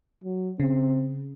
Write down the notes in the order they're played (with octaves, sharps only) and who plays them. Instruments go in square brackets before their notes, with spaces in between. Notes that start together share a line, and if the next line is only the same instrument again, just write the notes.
[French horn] F#3
[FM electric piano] C#3 [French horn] C4